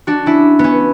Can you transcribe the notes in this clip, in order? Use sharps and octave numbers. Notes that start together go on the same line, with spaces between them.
D4 F#4
C#4 E4
B3 C#4